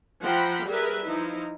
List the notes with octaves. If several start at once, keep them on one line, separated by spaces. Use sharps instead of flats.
F3 F#5 G5 A#5 B5
G3 G#4 A#4 B4 E5
F3 D#4 E4